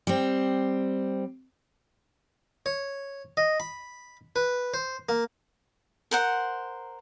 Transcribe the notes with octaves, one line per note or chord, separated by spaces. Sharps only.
G3 C4
C#5
D#5
B5
B4
C5
A#3
A#4 C5 F#5